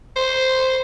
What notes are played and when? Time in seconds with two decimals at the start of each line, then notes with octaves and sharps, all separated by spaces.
0.16 C5